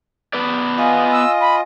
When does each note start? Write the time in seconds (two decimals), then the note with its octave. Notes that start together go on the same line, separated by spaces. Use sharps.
0.33 B3 B4 D5
0.78 F4 D#5 F5 G#5
1.12 E6
1.41 B5